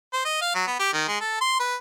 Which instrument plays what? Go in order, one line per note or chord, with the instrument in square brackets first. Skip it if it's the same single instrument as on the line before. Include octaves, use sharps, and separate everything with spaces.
[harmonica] C5
D#5
F5
F#3
B3
G4
D#3
G#3
A4
C6
B4